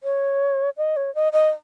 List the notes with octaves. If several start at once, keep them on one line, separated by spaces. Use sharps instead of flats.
C#5
D#5
C#5
D#5
D#5